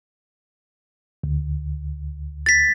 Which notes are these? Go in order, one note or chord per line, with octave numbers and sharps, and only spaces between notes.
D2
A6 B6